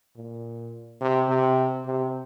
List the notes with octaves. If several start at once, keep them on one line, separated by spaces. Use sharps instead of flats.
A#2
C3
C3
C3